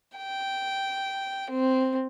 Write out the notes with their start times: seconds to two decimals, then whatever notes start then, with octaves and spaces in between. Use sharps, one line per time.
0.17 G5
1.50 C4